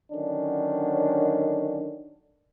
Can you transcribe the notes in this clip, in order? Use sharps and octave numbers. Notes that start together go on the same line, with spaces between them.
D3 D#3 F#3 C#4 D4